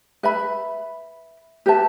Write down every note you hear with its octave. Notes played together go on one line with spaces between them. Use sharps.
B4 E5 B5
G4 B4 E5 A5